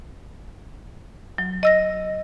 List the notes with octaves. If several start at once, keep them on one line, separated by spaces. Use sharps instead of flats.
F#3
D#5 E6 A#6